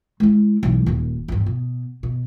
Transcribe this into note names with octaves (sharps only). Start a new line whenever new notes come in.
G#3 E4
B1 E3
D#1 D#2
E2 G2
B2
B2